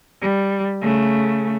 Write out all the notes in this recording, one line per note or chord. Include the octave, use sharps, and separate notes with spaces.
G3
C#3 A3